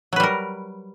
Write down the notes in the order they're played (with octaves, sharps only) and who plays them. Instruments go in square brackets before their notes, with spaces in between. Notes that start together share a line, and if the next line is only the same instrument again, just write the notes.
[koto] F#3
B4
G3
A#4